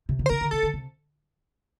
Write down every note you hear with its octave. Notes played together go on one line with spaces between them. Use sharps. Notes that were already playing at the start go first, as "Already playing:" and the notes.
C3
D3
C5
C3 A#4
D3
C3 A4
D3
C3